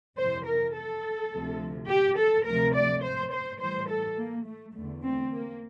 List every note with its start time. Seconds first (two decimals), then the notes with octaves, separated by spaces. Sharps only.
0.17 F2 C3 E3 C5
0.45 A#4
0.75 A4
1.31 D2 C3 F3
1.89 G4
2.18 A4
2.46 D2 C3 F3 A3 A#4
2.75 D5
3.04 C5
3.33 C5
3.60 A2 E3 G3 C5
3.89 A4
4.18 A#3
4.46 A3
4.76 E2 D3 A3
5.04 C4
5.33 A#3